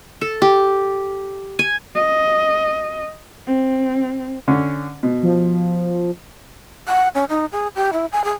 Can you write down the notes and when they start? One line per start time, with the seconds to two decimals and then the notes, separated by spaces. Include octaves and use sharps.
0.21 A4
0.42 G4
1.59 G#5
1.95 D#5
3.47 C4
4.48 D3 C#4
5.03 B2
5.23 F3
6.88 F#5
7.15 C#4
7.29 D#4
7.52 G#4
7.75 G4
7.93 E4
8.12 G#5
8.24 G#4